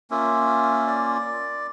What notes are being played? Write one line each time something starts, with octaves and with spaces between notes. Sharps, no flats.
A#3 C#4 F4 E5
D5